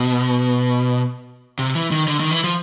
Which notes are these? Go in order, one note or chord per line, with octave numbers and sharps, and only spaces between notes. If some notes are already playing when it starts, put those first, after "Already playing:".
Already playing: B2
C3
E3
D#3
D3
D#3
E3
F3